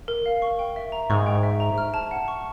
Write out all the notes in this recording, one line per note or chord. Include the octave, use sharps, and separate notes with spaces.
A#4
F5
C#6
G5
E5
A#5
G#2 C#6
G5
E5
A#5
F6
A5
F#5
C#6